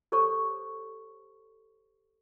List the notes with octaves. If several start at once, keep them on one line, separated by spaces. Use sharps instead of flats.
G4 A4 C5 C#5 C#6